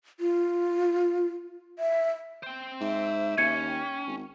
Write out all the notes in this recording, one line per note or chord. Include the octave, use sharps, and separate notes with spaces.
F4
E5
C5 G5
G#2 E5
D#2 C#4 G#6 C#7
G5
G#1